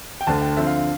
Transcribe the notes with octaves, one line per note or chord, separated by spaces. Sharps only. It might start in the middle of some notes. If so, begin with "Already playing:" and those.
G5
D2 D3 A3 A5
G5
D3 F3 C4 E5
F5
F5